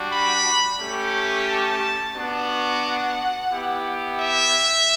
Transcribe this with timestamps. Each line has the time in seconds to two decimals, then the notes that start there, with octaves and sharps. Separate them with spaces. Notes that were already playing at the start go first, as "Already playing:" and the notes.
Already playing: G3 D4 F#4
0.10 B5
0.79 A3 C#4 G4
1.47 A5
2.15 B3 D4 F#4 F#5
3.51 B3 E4 G4
4.19 E5